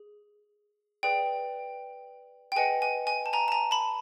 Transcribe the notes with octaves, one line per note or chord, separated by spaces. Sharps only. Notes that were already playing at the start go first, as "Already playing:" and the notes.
Already playing: G#4
G#4 B4 D5 G5
G5
G#4 B4 D#5 F#5 G#5
G#5
G#5
A5
G#5 A#5
A5
G#5 A#5
A5 B5